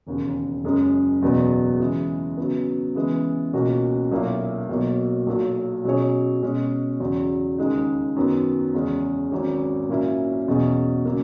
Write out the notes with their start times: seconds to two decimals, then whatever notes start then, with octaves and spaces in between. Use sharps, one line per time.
0.07 E1 D#2 C#3
0.64 F#1 F#2 C#3 G#3 C#4
1.22 F#1 E2 B2 F#3 B3
1.79 C#3 E3 G#3
2.37 C#3 F#3 B3
2.95 C#3 E3 G#3 B3
3.53 C#2 B2 A#3 C#4 F#4
4.12 B1 A#2 A#3 E4
4.69 B1 B2 F#3 A#3
5.27 B1 A#2 F#3
5.84 B2 F#3 C#4 G#4 C#5
6.42 B2 G#3 C#4
7.00 E2 C#3 F#3
7.58 D#2 C#3 G#3 D#4
8.16 F#2 D#3 F#3 B3
8.74 E2 C#3 G#3 C#4
9.31 G#1 G#2 F#3 C#4
9.89 A#2 F#3 C#4 E4 A#4
10.48 E2 B2 F#3 C#4 G#4
11.05 C#3 F#3 A#3